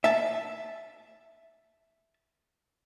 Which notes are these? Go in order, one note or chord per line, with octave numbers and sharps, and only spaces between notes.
E5 A5